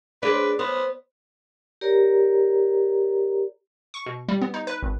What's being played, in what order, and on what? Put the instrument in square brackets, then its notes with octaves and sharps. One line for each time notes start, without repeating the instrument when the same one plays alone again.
[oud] D4 G#4 C5 [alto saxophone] B4
[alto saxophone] B3 [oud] C5
[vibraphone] G4 A#4 C#5 D5 A#5
[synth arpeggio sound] C#6
B2
G3
B3
D#4
B4
G#1